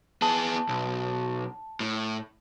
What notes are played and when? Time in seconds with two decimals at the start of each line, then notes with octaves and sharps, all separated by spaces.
0.22 B3 G#4 A5
0.69 B1
1.80 A2